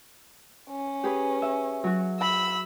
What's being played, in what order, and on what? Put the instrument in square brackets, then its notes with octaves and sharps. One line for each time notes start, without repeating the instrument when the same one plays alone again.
[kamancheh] C#4
[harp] G4 G#4 B4
E5
F#3 F#4
[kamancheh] B5 E6